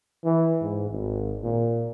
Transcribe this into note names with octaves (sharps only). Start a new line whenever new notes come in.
E3
G#2
G#1
A#2